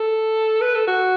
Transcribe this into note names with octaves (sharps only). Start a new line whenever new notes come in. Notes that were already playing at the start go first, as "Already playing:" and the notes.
Already playing: A4
B4
A4
F#4